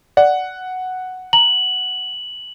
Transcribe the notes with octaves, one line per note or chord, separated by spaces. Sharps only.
D5 F#5
A#5 F#7